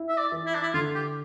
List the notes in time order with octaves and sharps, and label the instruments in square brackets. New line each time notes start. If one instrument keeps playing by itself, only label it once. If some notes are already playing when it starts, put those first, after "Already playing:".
Already playing: [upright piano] E4
[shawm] E5
D5
[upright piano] E3
[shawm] E4
D4
E4
[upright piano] D3 [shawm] F4
[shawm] G4